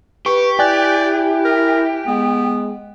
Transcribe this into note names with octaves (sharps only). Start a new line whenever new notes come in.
G4 B4 C#6
E4 D5 G5 G#5 F#6
A#4
G#3 B3